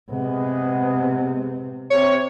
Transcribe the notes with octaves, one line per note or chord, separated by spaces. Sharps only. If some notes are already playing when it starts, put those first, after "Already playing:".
C3 G#3 B3
C3 C#5